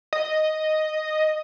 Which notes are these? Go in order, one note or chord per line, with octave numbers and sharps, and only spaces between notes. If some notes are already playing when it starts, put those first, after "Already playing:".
D#5